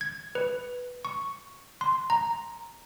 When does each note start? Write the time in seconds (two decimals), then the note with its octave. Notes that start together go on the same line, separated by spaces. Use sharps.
0.01 G#6
0.35 B4
1.05 C#6
1.81 C6
2.10 A#5